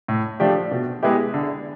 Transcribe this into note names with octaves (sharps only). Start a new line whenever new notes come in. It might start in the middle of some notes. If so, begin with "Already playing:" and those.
A2
F3 A3 D4 G4
B2
G#3 B3 E4 G4
D3